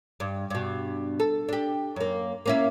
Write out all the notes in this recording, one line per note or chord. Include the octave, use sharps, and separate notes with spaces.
G2
G2 B2
A4
D4 G4
F#2 A#3
A#3 C#4 E4